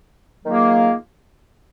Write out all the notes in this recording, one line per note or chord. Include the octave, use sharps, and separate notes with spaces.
D#3 F#3 A#3 F4 G#4